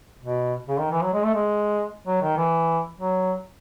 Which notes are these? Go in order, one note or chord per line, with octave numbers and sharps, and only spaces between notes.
B2
C#3
D#3
E3
F#3
G#3
A3
G#3
F#3
D#3
E3
F#3